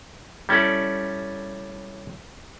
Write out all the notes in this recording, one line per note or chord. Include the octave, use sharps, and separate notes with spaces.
G3 C#4 E4 A4 D5